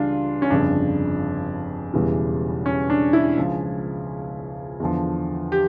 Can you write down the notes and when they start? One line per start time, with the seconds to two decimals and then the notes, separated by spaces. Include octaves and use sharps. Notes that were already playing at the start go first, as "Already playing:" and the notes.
Already playing: C#2 C#3 E3 G3 D4 F4
0.42 C#4
0.50 G1 F2 C#3 D4
1.94 E1 E2 C#3 E3 G3
2.66 C#4
2.90 D4
3.13 E4
3.37 C#2 C#3 F3
4.80 E2 D3 F3
5.52 G4